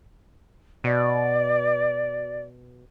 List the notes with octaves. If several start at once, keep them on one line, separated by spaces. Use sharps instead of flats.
B2 D5